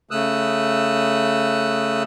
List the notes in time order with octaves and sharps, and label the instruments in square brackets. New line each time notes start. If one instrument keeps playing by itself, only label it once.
[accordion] C#3 A3 D#6 E6 F#6